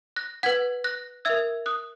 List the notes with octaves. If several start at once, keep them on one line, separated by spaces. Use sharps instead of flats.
F#6 A#6
B4 F#5 G#6 B6
F#6 A#6
A#4 E5 E6 G#6
D#6 F#6